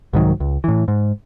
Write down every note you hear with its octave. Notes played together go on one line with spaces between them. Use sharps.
C2 G#2 D#3 F#3
C#2
A2 E3
G#2